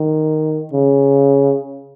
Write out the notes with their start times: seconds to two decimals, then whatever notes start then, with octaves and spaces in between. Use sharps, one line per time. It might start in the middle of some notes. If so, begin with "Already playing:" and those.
Already playing: D#3
0.73 C#3